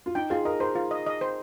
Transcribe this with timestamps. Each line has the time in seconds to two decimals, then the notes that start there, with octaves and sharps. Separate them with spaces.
0.06 F4
0.15 D#4 G5
0.30 F4 G#4
0.45 A#4 D#5
0.60 A#4 C5
0.76 F4
0.91 D#5
1.06 D#5
1.21 C5